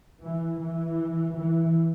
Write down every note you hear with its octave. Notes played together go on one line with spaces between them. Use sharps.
E3
E3
E3